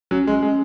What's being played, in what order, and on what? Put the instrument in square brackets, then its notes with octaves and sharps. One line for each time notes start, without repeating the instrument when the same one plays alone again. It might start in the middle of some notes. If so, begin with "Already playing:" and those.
[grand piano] F#3 [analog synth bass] C#4
[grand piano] G#3
G#3